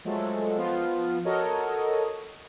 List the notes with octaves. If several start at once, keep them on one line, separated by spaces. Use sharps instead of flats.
F3 F#3 G#3 A3 A4
F3 B3 F4
F#4 A4 A#4 C#5 D#5